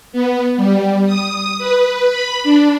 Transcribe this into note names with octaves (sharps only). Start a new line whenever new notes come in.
B3
G3
D#6
B4
B5
D4